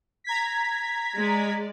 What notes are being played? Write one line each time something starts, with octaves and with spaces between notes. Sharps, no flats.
A#5 G#6 B6
G#3 D5